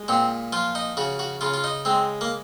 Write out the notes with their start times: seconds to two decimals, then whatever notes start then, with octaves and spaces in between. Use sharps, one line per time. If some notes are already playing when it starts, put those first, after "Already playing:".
Already playing: G#3
0.08 A#2 C4
0.53 F3 F4
0.75 D#4
0.97 C#3 F#4
1.19 F#4
1.41 C#3 F4
1.54 F4
1.64 D#4
1.85 G#3 C4
2.21 A#3